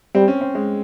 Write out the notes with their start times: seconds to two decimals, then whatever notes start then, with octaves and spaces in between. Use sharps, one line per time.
0.15 G3 C4
0.28 C#4
0.41 C4
0.55 G#3